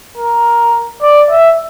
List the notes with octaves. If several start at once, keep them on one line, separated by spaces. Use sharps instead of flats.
A#4
D5
E5